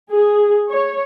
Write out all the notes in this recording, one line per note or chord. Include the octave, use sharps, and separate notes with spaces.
G#4
C#5